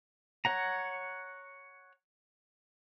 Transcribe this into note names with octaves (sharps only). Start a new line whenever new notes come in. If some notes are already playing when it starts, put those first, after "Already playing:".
C#5 F#5 A#5